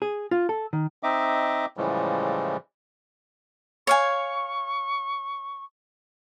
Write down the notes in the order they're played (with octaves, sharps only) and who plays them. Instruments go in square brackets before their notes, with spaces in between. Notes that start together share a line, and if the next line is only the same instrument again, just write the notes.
[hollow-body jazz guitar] G#4
F4
A4
D#3
[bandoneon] C4 D#4 D#5 E5 D6
A2 C#3 E3 F3 G3 G#3
[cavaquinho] C#5 F5 G#5 [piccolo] C#6